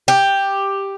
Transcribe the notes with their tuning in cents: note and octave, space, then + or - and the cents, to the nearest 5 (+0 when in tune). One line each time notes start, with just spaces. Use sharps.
G4 +5